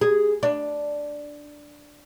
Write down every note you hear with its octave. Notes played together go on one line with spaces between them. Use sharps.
G#4
D4